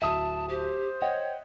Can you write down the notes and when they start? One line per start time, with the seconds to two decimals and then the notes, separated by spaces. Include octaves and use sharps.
0.02 D1 E5 A5 D#6
0.49 G4 C5
1.02 C#5 D#5 F#5 G5